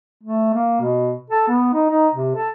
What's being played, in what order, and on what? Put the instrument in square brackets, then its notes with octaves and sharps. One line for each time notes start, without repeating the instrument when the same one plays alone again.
[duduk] A3
A#3
B2
A4
B3
D#4
D#4
C3
A4